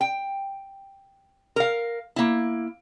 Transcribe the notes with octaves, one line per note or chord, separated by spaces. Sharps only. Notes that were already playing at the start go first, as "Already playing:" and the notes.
G5
A#4 F5
A#3 E4